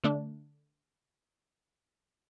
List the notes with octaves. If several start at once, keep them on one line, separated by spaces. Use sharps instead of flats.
D3 A3 D4